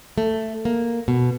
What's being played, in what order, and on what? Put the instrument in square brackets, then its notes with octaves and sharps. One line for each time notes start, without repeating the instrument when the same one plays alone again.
[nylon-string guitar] A3
A#3
B2